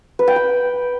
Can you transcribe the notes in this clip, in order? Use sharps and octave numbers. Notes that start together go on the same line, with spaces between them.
B4
G5
B5